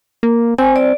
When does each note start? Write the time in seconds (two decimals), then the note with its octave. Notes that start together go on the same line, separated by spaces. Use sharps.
0.23 A#3
0.58 C4 G#5
0.76 D5